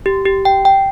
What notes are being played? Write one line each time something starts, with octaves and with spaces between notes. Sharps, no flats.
G4
G4
G5
G5